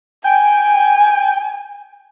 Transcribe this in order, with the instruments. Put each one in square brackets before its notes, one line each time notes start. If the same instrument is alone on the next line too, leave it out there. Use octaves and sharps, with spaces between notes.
[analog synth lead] G5 [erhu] G#5